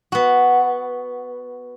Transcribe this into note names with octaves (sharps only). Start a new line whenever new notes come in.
B3 F#4